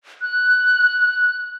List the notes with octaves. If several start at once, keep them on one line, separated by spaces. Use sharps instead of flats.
F#6